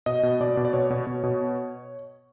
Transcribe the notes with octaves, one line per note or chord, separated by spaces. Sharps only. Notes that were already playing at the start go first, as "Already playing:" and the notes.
B2 D#5
B2
B2 D5
B2
D5
B2 C#5
B2
B2
B2